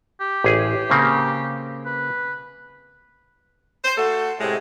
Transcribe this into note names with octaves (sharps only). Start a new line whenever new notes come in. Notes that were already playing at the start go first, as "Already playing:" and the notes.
G4
A1 G#4
C#3 A#3 C4
B4
C5
A3 F#4 A4
A2 C3 G#3